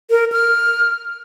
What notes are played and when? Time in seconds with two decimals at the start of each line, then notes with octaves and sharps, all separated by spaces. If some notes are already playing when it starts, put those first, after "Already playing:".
0.10 A#4
0.32 F6